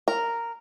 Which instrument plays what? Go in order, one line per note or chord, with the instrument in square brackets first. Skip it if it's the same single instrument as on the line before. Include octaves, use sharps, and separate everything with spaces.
[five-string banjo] A#4